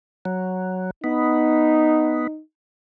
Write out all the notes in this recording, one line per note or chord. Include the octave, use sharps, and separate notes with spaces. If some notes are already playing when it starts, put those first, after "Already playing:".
F#3
B3 D#4